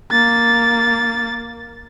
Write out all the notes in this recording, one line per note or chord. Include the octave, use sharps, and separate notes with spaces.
A#3 A6